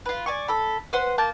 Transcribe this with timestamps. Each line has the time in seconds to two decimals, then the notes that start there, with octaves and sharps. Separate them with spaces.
0.05 F4 B4
0.26 D5 G#5 C#6
0.48 A4 B5
0.93 B4 C5 F#5 C6
1.18 A#3 A5 G6